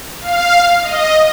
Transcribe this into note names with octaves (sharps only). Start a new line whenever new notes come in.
F5
D#5